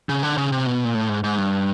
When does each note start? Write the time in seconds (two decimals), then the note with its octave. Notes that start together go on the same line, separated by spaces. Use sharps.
0.09 C#3
0.23 D3
0.37 C#3
0.52 C3
0.66 B2
0.84 A#2
0.95 A2
1.09 G#2
1.24 G#2
1.38 G2